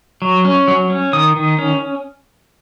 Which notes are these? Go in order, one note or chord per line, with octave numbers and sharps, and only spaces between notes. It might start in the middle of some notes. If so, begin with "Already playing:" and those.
F#3
C#4
F#3
C#4
D#3 D#6
D#3
C#4